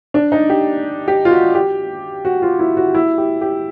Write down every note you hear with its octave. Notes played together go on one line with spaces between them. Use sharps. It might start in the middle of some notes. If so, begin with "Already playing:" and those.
D4
D#4
G4
G4
F4
F#4
G4
F#4
F4
E4
F#4
E4
G4
G4